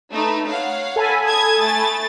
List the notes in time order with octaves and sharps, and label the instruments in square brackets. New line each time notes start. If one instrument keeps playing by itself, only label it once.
[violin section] A3 D#4 B4
C#5 F5 F#5
[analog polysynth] A4 G#5 B5
[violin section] A5 D#6 G#6
A3 A6